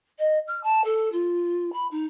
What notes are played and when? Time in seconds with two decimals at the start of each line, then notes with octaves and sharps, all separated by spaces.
0.19 D#5
0.47 F6
0.63 A5
0.84 A4
1.12 F4
1.72 B5
1.91 D#4